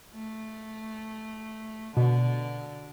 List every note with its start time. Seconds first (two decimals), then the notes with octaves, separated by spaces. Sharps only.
0.14 A3
1.97 B2 D3